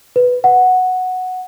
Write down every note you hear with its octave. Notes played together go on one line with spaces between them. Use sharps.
B4
F#5